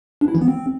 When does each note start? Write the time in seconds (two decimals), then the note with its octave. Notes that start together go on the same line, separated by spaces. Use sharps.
0.21 D4
0.28 E4
0.35 E3
0.41 B3
0.48 C4